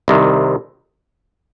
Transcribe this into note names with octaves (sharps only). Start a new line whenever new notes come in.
C2 C3 D#3